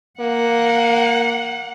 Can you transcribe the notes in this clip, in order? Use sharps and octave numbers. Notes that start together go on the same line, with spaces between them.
A#3 F#5